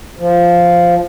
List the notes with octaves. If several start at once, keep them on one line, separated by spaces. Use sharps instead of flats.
F3